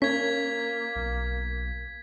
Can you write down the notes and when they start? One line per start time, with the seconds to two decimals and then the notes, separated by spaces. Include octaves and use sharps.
0.02 A#3 C#4 G#6 B6
0.96 B1